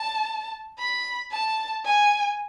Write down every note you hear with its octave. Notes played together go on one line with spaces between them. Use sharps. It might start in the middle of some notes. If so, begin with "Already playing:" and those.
Already playing: A5
B5
A5
G#5